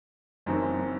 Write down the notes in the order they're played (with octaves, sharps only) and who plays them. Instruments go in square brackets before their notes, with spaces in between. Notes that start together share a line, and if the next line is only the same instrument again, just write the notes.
[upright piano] F#1 F#2 E3 C4 D#4